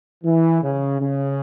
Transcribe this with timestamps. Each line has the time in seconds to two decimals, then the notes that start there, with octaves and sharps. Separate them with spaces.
0.24 E3
0.62 C#3
1.00 C#3